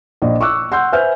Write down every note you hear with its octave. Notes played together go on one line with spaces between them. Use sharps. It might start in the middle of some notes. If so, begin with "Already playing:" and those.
A#1 D#5
C#6 D6 E6 F#6
F#5 C6 E6 G6
B4 C5 E5 G#5 F6 G6